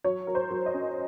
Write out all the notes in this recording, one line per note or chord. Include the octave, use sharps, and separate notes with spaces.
F#3 C#5
F#3 A#4
C5
F#3
D#5
C#4